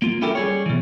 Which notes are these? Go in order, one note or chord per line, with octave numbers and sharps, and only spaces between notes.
A#3 F4
C#4 E4 F4 G4 A4 A#4
G3 G#4 C#5
B2 E3